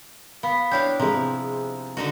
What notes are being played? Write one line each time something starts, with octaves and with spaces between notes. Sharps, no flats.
B3 F5 B5 B6
D4 E4 C#5 F5 G5 G6
C3 F3 G#3 E4 A#5
D3 D#4 F#4